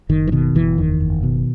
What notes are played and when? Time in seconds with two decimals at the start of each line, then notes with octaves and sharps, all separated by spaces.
0.09 F#1 D#3
0.27 E3
0.32 B2 D#3
0.55 F#1 E3
0.78 E2 D#3
1.00 F#1
1.23 B2